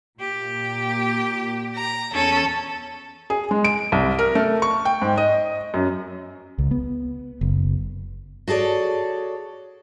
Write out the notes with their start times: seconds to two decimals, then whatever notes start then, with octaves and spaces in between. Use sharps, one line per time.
0.20 A#2 G4
1.75 A#5
2.14 E2 C#4 A4
3.30 G#4
3.51 G#3
3.65 D7
3.92 C2
4.19 A#4
4.35 A3
4.62 C#6
4.85 G5
5.02 G#2
5.17 D#5
5.74 F#2
6.58 C#2
6.71 B3
7.41 F#1
8.48 F#4 G#4 A4 C#5 D5